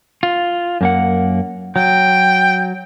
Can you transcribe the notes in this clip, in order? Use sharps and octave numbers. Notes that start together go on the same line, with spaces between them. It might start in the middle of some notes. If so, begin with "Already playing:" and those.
F4
F#2 A#3 F#5
F#3 G5